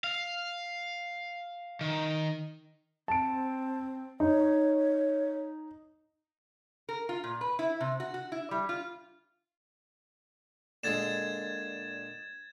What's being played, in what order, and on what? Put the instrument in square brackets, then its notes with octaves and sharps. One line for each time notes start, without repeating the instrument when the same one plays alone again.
[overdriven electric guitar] F5
D#3
[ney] C4 [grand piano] A5 D7
[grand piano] D#4 [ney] C#5
[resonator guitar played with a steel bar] A#4
F4
A#2
B4
E4
C3
F#4
F#4
E4
G3
F4
[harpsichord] A#2 D3 G#3 [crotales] G#6 A6 E7